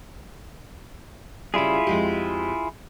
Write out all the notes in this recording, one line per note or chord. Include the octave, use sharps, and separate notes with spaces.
C#3 G3 E4 F4 G#4
F2 G#3 G4